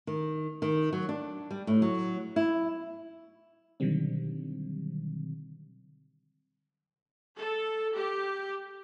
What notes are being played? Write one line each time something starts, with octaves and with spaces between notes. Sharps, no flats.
D#3
D#3
F#3
D4
G3
A2
F#3
E4
B2 D3 D#3 F#3 G3 C4
A4
G4